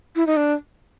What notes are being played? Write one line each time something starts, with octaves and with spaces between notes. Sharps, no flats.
E4
D#4
D4